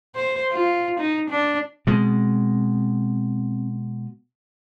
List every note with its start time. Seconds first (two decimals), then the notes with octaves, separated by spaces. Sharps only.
0.16 C5
0.53 F4
1.00 D#4
1.30 D4
1.87 B2 G#3 C4